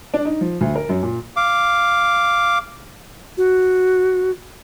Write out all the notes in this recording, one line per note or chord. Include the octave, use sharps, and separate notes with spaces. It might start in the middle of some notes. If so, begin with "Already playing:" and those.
D4
D#4
F3
D2
A#4
F#2
A#2
F5 D6
F#4